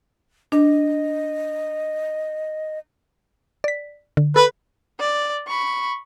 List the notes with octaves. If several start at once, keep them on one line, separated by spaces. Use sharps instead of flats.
D4 D#5
D5 B6
D3
A4 B4
D5
B5 C#6